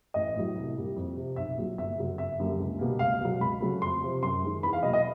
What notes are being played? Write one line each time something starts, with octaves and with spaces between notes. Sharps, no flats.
A1 D#5
A2 F#3
C2
A#2 G3 A#3
F2
C3 F3
B1 E5
A#2 F#3
G1 E5
F#2 C#3 F#3
G1 E5
F#2 D3 G3 A#3
C#2
B2 G3 A#3
C#2 F5
B2 F#3
C#2 B5
C#3 F#3 A3
F2 C6
C3 F3
F#2 C6
D#3 G#3
E2 B5
F5
B2 F#3 A#3 D#5
D#5